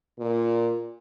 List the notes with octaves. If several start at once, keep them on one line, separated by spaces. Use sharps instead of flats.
A#2